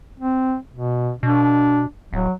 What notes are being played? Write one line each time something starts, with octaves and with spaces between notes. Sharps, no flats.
C4
B2
B2 D4
D1 F#3